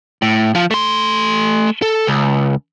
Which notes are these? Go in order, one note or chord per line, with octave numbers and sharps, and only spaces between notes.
A2
F3 F4
A3 C6
A4
C#2